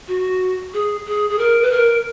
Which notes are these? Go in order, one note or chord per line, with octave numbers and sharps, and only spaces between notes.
F#4
G#4
G#4
G#4
A#4
B4
A#4